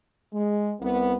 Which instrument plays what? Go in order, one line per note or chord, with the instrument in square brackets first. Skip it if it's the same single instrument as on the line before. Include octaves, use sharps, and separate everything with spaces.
[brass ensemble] G#3
C2 B3